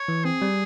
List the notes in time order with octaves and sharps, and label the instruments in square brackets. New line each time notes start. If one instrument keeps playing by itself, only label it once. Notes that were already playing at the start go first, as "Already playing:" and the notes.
Already playing: [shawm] C#5
[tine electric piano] E3
[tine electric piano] C4 [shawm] G#4
[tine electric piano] G3